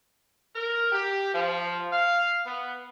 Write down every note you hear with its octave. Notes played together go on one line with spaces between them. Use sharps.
A#4
G4
F3
F5
B3